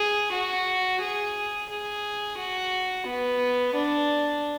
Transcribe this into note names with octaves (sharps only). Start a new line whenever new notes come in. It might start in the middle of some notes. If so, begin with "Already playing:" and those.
Already playing: G#4
F#4
G#4
G#4
F#4
B3
D4